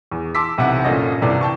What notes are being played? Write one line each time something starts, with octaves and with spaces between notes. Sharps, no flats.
E2
A5 C6 D6 E6 B6
B1 C3 E3 E4 F#5
G1 A#2 C#4 A4 D#5 A#6
G1 C3 E3 D5
G5 A5 C#6